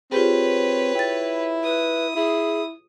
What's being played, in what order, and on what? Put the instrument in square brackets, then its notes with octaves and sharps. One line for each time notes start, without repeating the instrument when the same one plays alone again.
[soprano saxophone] C4 [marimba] F4 G4 G#4 [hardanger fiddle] B4 C#5
[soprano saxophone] E4 [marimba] G5 A6
[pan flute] B4 [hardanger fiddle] D#6
[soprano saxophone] E4 [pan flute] G#4